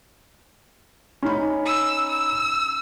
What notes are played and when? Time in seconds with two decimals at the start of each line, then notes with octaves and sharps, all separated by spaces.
1.23 C#4 D#4 B5
1.66 E6
2.09 E6